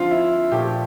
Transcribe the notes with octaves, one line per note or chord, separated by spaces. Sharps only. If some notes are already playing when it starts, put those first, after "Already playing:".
Already playing: D3 F3 C4 F4
E4
A#2 F3 A3 G4